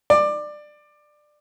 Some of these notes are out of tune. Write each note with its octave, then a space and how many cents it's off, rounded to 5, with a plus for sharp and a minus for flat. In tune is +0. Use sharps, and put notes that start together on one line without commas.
D5 +20